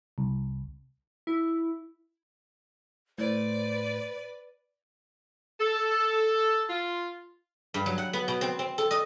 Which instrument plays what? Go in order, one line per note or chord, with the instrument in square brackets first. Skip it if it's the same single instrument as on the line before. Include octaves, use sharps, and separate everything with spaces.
[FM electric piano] C2
[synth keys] E4
[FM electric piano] A2 [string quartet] B4 D5 [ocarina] C5
[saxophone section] A4
F4
[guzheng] G2
F#3
F#5
B3
B2
C4
C4
A4
D#5